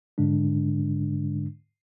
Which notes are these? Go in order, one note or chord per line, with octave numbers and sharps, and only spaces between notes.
G#2 D3 G#3 D4